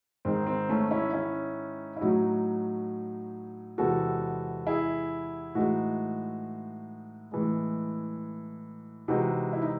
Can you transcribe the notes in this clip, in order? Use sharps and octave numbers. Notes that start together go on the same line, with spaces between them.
G#2 D#3 G#3 C4
C4
A3 C#4
C#4 E4
C#4 E4
E4
A2 F#3 D#4 F#4
E2 C3 E3 G#3 F#4 A4
E4 G#4
A2 E3 G#3 D#4 F#4
A2 E3 G#3
C3 E3 G#3 D#4 F#4
E4
D#4